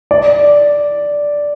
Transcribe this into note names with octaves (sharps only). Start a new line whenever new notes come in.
D5